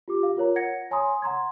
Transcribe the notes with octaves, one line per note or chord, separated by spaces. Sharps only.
F4 G4 D6
F5
F4 A#4 C#5 A#5
F#5 G#6 A#6 C#7
C#5 G#5 A#5 C6 D#6
F#5 A#5 C6 G#6